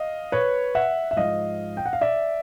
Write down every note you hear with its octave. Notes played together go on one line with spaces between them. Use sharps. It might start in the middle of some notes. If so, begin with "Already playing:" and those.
Already playing: D#5 F5
B4 C#5
E5 F#5
E5
G#2 F3 D#5 F5
G5
F#5
F5
D5 E5